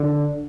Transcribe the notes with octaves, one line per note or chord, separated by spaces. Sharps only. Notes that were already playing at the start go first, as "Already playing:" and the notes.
Already playing: D3